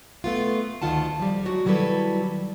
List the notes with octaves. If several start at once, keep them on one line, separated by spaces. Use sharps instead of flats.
A3 B3 F4
D2 D#3 F4 F#5 A5
F3 G3
F#3 G#3 F#4
D#3 F#3 G3 E4 A4 B4